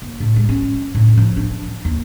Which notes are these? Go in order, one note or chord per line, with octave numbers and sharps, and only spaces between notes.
D#2
A2
G#3
C#4
A2
F3
D4
D#2